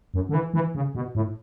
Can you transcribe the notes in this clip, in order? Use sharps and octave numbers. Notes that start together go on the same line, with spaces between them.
F#2
D3
E3
E3
C#3
B2
A2